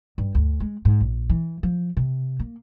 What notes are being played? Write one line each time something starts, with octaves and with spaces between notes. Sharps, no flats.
G2
D2
G#3
G#2
A#1
E3
F3
C3
A#3